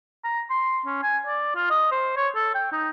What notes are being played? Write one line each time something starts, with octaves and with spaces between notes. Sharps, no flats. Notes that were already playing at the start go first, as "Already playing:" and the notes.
A#5
C6
C#4
G#5
D5
F4
D#5
C5
C#5
A4
G5
D#4